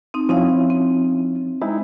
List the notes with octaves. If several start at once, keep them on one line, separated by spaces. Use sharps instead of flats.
C4 D#4
F3 C4 C#4 D#4 E4 F5
C4
G#3 C4 D#4 E4